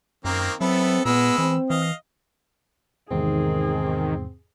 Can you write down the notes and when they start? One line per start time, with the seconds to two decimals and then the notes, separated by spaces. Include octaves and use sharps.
0.25 F#2 D#3 A#3 C4
0.61 F#3 B3 C4 E4 A4
1.05 A#2 G#3 B3 B5 E6
1.38 E3 C4
1.70 E3 D#5 F5
3.11 E2 G#2 C3 D#3 C4 G#4